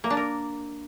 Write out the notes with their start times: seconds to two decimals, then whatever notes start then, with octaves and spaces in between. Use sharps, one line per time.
0.04 A#3
0.10 D4
0.17 A#4